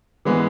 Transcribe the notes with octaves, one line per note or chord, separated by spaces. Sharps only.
E3 G#3 B3